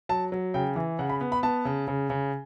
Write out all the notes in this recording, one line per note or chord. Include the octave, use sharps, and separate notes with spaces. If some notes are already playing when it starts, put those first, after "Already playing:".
F#3 A5
F#3
C#3 G5
E3
C#3 F#5
B5
B3
B5
B3 A5
C#3
C#3
C#3